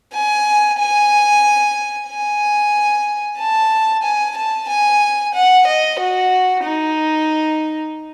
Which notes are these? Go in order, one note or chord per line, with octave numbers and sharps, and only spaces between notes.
G#5
G#5
G#5
A5
G#5
A5
G#5
F#5
D#5
F#4
D#4